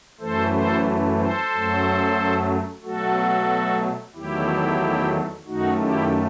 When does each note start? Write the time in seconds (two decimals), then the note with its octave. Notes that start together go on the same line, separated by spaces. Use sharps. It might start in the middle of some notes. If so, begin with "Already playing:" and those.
0.20 F#2 E3 A3 A4 C5
0.53 A4 C5
1.19 A4 C5
1.52 F#2 F#3 A3
2.83 B2 F#3 A3 F#4 A4
4.15 E2 D#3 F#3 A3 E4 G4
5.47 F#2 D#3 A3 D#4 F#4
5.79 E4 G4